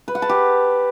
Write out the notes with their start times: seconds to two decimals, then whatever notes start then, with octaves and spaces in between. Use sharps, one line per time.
0.08 B4
0.15 F#5
0.22 A5
0.29 G4